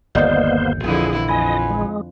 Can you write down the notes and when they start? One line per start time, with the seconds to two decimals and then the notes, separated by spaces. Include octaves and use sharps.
0.15 G1 D#2 A#3 B3 C5 D5 D#5 G6
0.47 G6
0.84 A#1 F2 D3 E3 E4 G#4
1.28 F2 D#5 G#5 B5 G#6
1.70 G#3